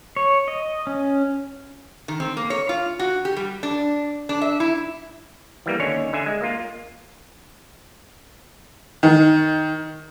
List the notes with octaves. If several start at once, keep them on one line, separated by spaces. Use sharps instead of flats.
C#5
D#5
C#4
D#3
C4
A#3
C#5
F4
F#4
G4
G3
D4
D4
E5
E4
E3 G3 A#3
D#2 D3 C#4 C#5
D3 E5 G#5
G#3
A#3 F4
D#3